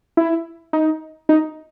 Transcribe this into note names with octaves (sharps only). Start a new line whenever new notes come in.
E4
D#4
D#4